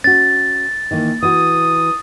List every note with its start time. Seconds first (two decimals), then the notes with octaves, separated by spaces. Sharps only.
0.04 C#4 F#4 A6
0.91 D#3 E3 A#3
1.23 E3 F#4 D#6